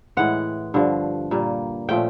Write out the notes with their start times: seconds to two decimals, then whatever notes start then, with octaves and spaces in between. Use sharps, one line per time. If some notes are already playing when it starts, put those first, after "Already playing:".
0.17 A2 E3 G#3 F#5
0.74 G2 D3 F3
1.31 A#2 G3 A#3
1.89 A#2 F3 A3 C#4 G5